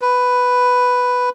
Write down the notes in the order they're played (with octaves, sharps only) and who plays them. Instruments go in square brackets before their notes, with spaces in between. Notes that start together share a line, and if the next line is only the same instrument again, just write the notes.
[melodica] B4